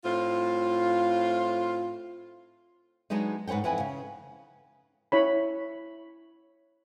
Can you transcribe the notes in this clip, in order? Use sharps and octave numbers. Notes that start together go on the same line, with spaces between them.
A2 C4 F4
F#3 G#3 B3 D4 D#4
G#2 B4 C#5 F#5 G5
F2 E3 B4 F#5 G#5
C#3
E4 C#5 B5